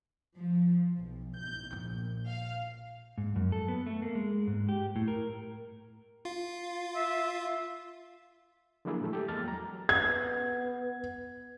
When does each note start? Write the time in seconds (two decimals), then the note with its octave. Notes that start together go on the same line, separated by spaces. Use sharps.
0.37 F3
0.97 B1
1.40 G6
1.79 A#1
2.27 F5
3.18 G#2
3.36 F#2
3.52 A4
3.68 B3
3.87 A3
4.02 A#3
4.15 G#3
4.47 G#2
4.69 G4
4.96 A2
5.08 A#4
6.25 F4 F5
6.96 E5
8.85 D3 F3 F#3 A#3 E4 G#4
9.01 A2 E3 G#3 A3
9.13 G4 A4 D6
9.28 E2 G#3 A#3 F6 A6
9.43 F#3 A#5
9.89 B3 G#6